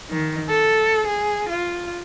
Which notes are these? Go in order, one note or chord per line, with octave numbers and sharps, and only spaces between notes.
D#3
A4
G#4
F4